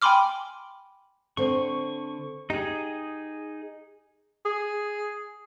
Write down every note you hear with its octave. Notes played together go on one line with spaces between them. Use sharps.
G5 G#5 B5 C6 D6 F6
D3 C4 C#6
D#4 G4 G#4
G#4